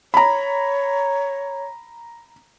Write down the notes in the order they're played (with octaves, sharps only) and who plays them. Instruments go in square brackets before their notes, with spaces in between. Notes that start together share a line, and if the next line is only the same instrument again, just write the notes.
[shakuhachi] C#5 [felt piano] A#5 B5